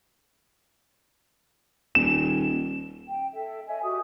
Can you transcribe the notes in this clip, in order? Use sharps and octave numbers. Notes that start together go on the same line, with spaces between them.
D#1 E7
G5
A4 E5
C#5 D#5 E5 G#5
F#4 G4 D#6